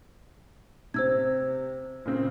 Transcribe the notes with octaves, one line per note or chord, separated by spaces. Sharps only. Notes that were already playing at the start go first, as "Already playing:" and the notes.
C3 C5 E6 G#6
A#2 C#3 C4